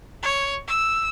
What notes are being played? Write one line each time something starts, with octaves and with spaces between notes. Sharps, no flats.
C#5
E6